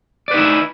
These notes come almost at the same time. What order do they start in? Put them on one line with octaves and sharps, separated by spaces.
D5 B4 D#4 E4